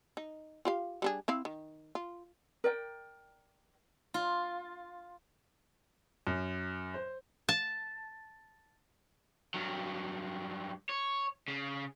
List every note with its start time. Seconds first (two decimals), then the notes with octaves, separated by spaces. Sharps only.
0.17 D#4
0.65 F4 G4 F5
1.02 G3 D4 G#4
1.28 C4 E4 F5
1.45 D#3
1.95 F4
2.64 A#4 D5 G5
4.14 F4
6.27 F#2
6.94 C5
7.49 A5
9.54 G2 F#3
10.89 C#5
11.48 C#3